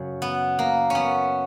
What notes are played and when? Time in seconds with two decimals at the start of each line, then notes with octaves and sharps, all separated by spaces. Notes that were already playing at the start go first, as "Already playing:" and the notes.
Already playing: F#2 C#3
0.22 B3
0.59 A#3
0.90 B3 C#4